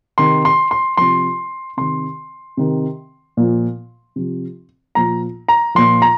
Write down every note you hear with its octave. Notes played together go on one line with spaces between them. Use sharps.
C3 D#3 C6
C6
C6
C3 F3 C6
C3 D#3 C6
C3 D#3
A#2 F3
C3 F3
A#2 F3 A#5
A#5
A#2 F3 C6
A#5